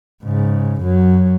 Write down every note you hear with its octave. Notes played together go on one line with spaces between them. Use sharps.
G#2 C#3
F#2 F#3